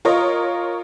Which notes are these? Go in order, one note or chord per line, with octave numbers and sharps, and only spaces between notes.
F4 A#4 C#5 D#5